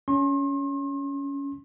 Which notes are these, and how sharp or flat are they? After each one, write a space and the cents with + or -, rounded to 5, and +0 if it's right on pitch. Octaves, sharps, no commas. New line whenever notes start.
C#4 +15 C6 +40